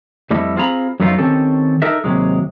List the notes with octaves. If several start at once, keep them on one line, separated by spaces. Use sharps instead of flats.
F2 F3 G3 A3 E4 D#5
C4 F4 G#4 A#5 B5
F#2 F#3 A3 B3 D#4 F4
D#3 C4 C#4 G4 A4
D#4 A4 A#4 D#5 E5
D#2 C3 F#3 G#3